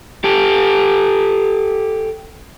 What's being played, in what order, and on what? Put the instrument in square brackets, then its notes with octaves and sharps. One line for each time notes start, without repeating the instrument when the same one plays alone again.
[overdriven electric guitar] G4 A4